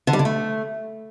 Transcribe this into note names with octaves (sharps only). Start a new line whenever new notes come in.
D3
G3
D3
A3